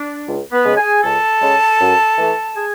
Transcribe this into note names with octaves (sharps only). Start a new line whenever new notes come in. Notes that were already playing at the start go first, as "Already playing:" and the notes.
Already playing: D4
C#2
B3 B4
C#3 G#3
G#4 G#5
C#2 A4 A5
C#3 G#3
F#2
E3 A3
G#4 G#5